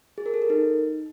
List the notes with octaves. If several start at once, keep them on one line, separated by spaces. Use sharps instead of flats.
G#4
A#4
A4
A#4
D#4